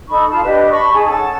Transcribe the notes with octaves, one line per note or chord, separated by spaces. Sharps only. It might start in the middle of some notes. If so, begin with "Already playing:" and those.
D#4 A4 B5 C#6
F4 F5 A5 B5
D4 G4 B4 D#5
A5 B5 C#6
D#4 G#4 G#5 A5
C#4 A4 F#5 A5